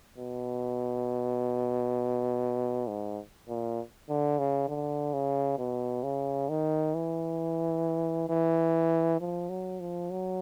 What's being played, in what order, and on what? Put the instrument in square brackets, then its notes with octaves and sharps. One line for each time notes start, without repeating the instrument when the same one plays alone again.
[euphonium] B2
G#2
A#2
D3
C#3
D3
C#3
B2
C#3
D#3
E3
E3
F3
F#3
F3
F#3